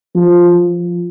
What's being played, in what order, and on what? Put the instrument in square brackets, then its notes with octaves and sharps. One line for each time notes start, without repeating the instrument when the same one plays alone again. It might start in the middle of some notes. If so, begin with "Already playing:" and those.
[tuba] F3